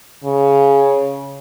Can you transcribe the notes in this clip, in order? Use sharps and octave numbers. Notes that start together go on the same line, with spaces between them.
C#3